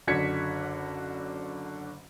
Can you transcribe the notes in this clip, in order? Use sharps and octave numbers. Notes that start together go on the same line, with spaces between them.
F#1 D3 F#4 G#6 B6 C#7